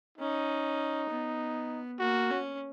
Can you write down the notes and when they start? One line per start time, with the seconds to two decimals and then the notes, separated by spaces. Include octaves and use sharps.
0.18 C#4 D#4
1.09 B3
1.99 A#3 F#4
2.30 C#4